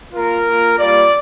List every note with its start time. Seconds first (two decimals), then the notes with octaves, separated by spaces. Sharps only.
0.13 A#3 F4 A#4
0.46 A#3 F4
0.78 G3 A#3 F4 D5